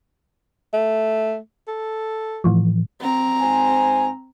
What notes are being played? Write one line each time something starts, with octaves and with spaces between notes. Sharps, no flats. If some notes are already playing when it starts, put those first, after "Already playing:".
A3
A4
A2 E3 F3
C4 A#5
G#2 C5 G#5